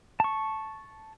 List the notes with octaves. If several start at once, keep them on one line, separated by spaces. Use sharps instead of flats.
A5 C#6